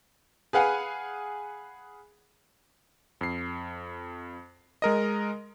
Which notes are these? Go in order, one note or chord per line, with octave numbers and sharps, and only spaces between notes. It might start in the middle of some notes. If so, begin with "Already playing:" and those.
G#4 B4 F5 F#5 G#5
F2 C7
G#3 A#4 D#5